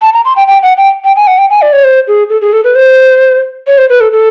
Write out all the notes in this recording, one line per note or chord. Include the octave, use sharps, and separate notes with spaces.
A5
A#5
C6
G5
G5
F#5
G5
G5
G#5
F#5
G5
G#5
D5
C#5
C5
G#4
A4
G#4
A4
B4
C5
C#5
C5
B4
A4
A4